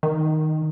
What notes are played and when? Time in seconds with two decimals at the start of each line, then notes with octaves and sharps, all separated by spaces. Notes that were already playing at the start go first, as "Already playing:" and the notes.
0.03 D#3